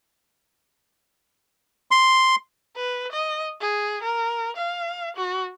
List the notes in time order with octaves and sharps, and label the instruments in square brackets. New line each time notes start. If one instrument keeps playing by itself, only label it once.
[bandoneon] C6
[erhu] B4
D#5
G#4
A#4
F5
F#4